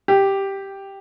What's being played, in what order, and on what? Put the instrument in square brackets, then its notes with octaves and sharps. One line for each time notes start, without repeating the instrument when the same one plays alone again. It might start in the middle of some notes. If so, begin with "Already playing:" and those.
[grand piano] G4